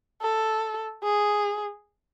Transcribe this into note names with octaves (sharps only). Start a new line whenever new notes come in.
A4
G#4